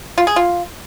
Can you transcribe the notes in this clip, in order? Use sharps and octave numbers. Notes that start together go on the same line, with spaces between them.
F4
G#4
F4